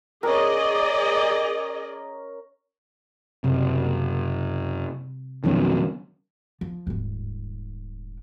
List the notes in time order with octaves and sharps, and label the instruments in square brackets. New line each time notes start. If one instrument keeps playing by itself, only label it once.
[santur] C#4 A#4 [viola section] G#4 D5 D#5
[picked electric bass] F#1 [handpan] C3
[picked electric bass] F2 B2 [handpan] D#3 F#3 C#4
[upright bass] F3
D#1 G#2